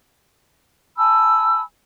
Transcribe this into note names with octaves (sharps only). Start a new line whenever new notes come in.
G#5 A5 B5 E6